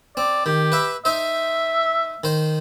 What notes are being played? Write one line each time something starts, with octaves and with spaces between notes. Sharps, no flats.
C4 D5
D#3 G4
B4 E5
D#4 C5 E5
D#3 C5